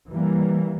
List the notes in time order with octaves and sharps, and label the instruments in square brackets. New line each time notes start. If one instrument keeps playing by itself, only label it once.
[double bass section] E3 G3 A#3